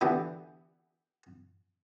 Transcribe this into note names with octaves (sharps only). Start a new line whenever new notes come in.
D3 E3 B3 G4